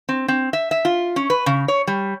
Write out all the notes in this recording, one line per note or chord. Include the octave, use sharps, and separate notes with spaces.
C4
C4
E5
E5
F4
C#4
B4
C#3
C#5
G3